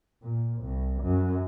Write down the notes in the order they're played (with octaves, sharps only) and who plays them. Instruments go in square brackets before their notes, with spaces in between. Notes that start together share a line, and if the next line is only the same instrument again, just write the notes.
[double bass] A#2
C2
F#2